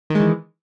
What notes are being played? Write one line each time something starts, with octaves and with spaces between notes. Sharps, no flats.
D#3 E3 G#3